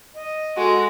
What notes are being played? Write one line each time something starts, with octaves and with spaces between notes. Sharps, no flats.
D#5
G#3 F#4 A4